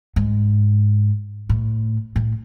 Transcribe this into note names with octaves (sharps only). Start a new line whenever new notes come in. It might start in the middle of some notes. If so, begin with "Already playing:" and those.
G#2
A2
A2